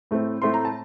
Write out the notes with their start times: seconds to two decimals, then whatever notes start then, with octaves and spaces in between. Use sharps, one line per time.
0.11 A2 A3 C4
0.42 A2 A3 C4 C6
0.54 A#5
0.65 A5